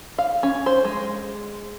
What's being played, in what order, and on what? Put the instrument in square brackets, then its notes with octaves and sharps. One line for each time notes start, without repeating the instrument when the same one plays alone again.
[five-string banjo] F5
C#4
C5
G#3